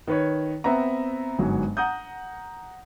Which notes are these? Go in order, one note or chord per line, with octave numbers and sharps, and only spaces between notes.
D#3 B4 C#5
B3 C4 B4 E5 A#5
G1 G#2 F#3
F#5 A#5 D#6 G6